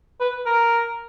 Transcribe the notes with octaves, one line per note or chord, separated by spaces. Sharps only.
B4
A#4